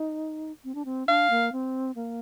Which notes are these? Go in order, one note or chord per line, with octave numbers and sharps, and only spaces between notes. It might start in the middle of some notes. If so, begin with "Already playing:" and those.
Already playing: D#4
C4
D4
C4
D4 F5
A#3
C4
A#3